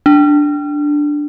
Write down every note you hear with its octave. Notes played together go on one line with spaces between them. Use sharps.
D4